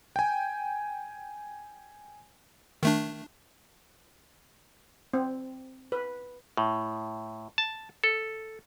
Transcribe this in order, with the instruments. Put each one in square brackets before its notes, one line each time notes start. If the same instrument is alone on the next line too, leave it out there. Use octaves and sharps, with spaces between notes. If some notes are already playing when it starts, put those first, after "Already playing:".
[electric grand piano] G5 G#5
[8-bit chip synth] D#3 A3 D4
[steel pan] C4
B4
[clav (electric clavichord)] A2
A5
A4